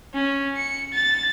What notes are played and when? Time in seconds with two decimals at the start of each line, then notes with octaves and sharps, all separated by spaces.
0.14 C#4
0.56 C#7
0.93 A6